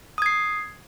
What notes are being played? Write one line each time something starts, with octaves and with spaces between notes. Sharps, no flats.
D#6 G#6 C7